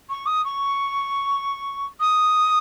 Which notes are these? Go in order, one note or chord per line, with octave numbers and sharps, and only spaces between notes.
C#6
D#6
C#6
D#6